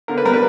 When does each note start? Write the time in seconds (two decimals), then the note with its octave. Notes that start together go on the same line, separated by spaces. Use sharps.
0.08 D3 A#4
0.18 B4
0.25 G3 A#4
0.33 B4